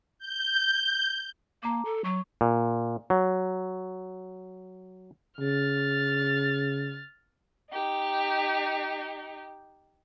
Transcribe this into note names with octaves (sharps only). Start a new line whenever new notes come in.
G6
A#3 A5 A#5 D6
A4
F#3 C#6
A#2
F#3
C#3 F6 A6
D#4 G4